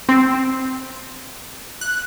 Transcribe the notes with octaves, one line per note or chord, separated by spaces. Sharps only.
C4
F#6